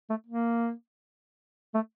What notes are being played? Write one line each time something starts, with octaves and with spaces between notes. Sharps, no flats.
A3
A#3
A3